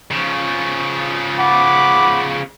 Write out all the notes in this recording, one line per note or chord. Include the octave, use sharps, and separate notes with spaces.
C#3 F3
F#5 B5 D6